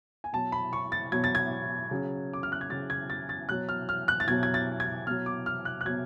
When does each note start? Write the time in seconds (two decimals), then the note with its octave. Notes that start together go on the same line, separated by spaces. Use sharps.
0.24 G#5
0.33 B2 F#3 A5
0.52 B5
0.73 C#6
0.92 A6
1.12 B2 F#3 G#6
1.24 A6
1.35 G#6
1.91 C#3 F#3
2.33 D6
2.43 F6
2.52 F#6
2.61 G#6
2.69 C#3 F#3 A6
2.90 G#6
3.10 A6
3.29 A6
3.48 B2 F#3 F#6
3.69 F6
3.89 F6
4.08 F#6
4.20 A6
4.28 B2 F#3 G#6
4.43 G#6
4.54 A6
4.80 G#6
5.07 B2 F#3 F6
5.26 D6
5.46 F6
5.65 F#6
5.81 F#6
5.85 B2 F#3 G#6